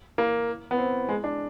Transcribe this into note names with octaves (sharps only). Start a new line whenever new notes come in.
A#3
B3
C4
G#3
D4